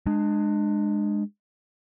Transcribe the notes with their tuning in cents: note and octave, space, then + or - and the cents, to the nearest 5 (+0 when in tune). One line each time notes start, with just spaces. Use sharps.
G#3 +0 D4 +30